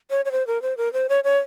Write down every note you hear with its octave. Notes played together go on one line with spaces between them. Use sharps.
C#5
C#5
C5
A#4
C5
A#4
C5
C#5
C#5